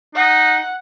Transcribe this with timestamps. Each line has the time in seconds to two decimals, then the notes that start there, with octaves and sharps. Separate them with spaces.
0.15 D#4 F#5